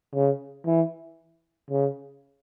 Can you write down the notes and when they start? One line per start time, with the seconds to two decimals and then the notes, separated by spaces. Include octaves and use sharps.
0.14 C#3
0.65 E3
1.70 C#3